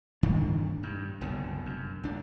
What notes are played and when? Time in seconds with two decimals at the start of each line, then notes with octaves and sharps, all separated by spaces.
0.23 G2 D#3 D4
0.83 G2
1.21 F#1 C2 B2 D3
1.66 F#2
2.03 C#2 D4